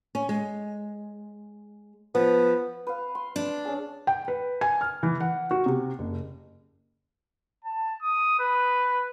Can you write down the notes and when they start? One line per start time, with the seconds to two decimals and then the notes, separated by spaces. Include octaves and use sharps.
0.15 C#4
0.29 G#3
2.15 F3 B3
2.87 B4 F5
3.15 C6
3.36 D4
3.65 C#4 G#4
4.07 G5
4.28 B4
4.61 G#5
4.81 F6
5.03 E3
5.20 F#5
5.51 F#4
5.66 C3
5.99 F#1
7.64 A5
8.02 D#6
8.40 B4